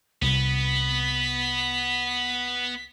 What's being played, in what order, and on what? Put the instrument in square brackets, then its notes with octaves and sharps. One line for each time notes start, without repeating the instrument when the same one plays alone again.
[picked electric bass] C2 [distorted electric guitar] B3 [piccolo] B6